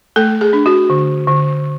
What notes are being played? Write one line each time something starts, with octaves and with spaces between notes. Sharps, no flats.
A3 A4
G#4
D4
F#4
D3
D3